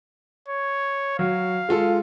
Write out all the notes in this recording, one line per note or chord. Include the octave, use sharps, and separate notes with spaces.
C#5
F#3 F5
G#3 F4 A4